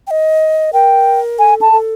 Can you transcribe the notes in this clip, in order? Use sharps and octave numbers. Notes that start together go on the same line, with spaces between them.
G5
D#5
A#4 G5
A4 G#5
A5
A4